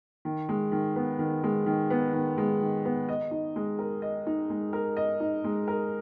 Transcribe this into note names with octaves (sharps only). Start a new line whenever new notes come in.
D#3
G#3
D#3
B3
D#3
G#3
D#3
B3
D#3
G#3
D#3
B3
D#5
D#4
G#3
A#4
D#5
D#4
G#3
A#4
D#5
D#4
G#3
A#4